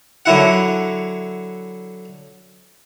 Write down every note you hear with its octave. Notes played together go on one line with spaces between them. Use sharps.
D3 F#3 E4 F#5